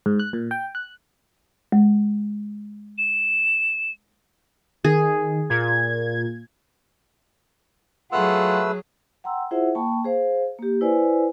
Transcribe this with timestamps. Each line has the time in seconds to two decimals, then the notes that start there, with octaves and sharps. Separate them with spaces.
0.06 G#2
0.20 F#6
0.33 A#2
0.51 G5
0.75 F#6
1.72 G#3
2.98 E7
4.85 D#3 G#4
5.50 A#2 G#6
8.12 F#3 A3 F4 G#4 B4 F#5 E6
9.24 F#5 G5 A#5 C6 E6
9.51 E4 F4 G#4 C5 E5 F#5
9.75 A#3 G5 A5 B5 C#6
10.04 G#4 C5 F5
10.59 A#3 G4
10.81 E4 B4 C5 D5 G#5